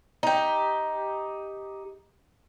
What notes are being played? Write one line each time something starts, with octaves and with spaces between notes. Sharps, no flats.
D#4 G4